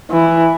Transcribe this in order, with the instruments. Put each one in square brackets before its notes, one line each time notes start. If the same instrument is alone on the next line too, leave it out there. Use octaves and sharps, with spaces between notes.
[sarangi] E3